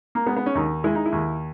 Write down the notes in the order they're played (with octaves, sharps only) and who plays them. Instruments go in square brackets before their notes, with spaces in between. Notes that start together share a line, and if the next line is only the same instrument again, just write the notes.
[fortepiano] A#3
G#3 B3
B3
C#4
D#2 D#4
G#3 E4
D#4
E4
D#2